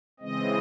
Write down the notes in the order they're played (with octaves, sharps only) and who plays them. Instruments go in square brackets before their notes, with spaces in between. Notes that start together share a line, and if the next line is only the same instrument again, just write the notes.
[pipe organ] C#3 E3 G#3 C4 D#5